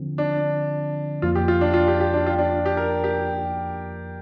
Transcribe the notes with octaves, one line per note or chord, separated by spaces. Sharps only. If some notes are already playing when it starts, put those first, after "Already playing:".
Already playing: D3 F3 C4
D4
F2 F3 A#3 F4
G4
F4
D4
F4
G4
G4
D4
F4
D4
G4
A#4
G4